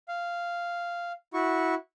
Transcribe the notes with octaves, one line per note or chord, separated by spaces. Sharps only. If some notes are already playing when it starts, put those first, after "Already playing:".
F5
E4 F#4 C#6